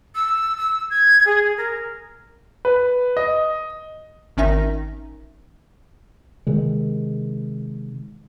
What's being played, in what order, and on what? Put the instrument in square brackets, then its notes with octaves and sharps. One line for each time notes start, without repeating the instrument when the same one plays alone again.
[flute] E6
E6
G#6
G#4
A#4
[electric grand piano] B4
D#5
[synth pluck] G#1 D#3 C#4 D#4 E5 A#6
[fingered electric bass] C3 D#3 G#3